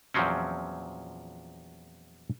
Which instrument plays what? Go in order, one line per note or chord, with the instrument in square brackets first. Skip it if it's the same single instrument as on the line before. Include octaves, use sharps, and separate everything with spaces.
[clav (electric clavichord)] E2 A#2 F3 F#3 C4 C#4